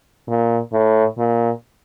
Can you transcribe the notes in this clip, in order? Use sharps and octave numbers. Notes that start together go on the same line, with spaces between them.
A#2
A2
A#2